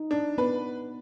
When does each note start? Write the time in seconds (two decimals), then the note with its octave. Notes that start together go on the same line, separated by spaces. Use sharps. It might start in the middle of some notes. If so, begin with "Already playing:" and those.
Already playing: D#4
0.11 D4
0.38 B3 B4